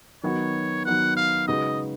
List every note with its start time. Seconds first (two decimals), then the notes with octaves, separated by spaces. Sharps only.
0.23 D#3 F#3 B3 D#4 F#4 C#5
0.85 D#3 F#3 B3 D#4 F#4 F#5
1.17 F5
1.48 C#3 G#3 D#4 F#4 B4 D#5